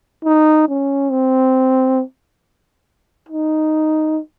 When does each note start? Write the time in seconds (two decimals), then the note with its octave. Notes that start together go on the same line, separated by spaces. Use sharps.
0.25 D#4
0.69 C#4
1.11 C4
3.29 D#4